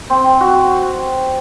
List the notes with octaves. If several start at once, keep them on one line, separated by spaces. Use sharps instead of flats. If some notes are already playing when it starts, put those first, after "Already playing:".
C4
F#4